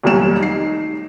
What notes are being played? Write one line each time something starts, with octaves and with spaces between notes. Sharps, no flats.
F1 D#2 A#2 F#3 G3 E7
D#4 C7